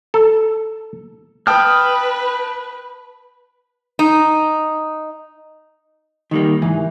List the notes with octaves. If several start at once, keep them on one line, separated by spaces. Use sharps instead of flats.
A4
B4 G5 A5 D#6 F6
D#4
D#3 G3 A#3
G#2 E3